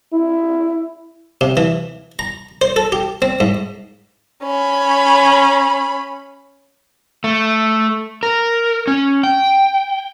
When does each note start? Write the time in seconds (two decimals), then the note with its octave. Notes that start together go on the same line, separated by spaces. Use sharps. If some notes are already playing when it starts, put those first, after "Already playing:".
0.13 E4
1.41 C3
1.57 E3
2.19 A#5
2.61 C5
2.76 A4
2.92 G4
3.22 C4
3.40 G#2
4.43 C#4 B5
7.24 A3
8.23 A#4
8.87 C#4
9.23 G5